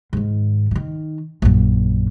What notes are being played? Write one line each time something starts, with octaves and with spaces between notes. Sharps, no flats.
G#2 D#3
D#3 E3
A#1 F#2